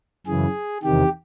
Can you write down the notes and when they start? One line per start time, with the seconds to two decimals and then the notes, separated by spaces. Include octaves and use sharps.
0.26 F#2 C#3 E3 G#4
0.83 E2 C3 D#3 G4